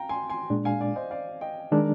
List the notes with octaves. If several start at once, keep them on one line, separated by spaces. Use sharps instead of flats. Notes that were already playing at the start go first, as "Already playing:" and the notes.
Already playing: F5 G5 A#5
G#5 C6
G#5 C6
A#2 G#3 D4
F5 G#5
D5 F5
C5 D#5
D5 F5
D#5 G5
D#3 G#3 D4 A#4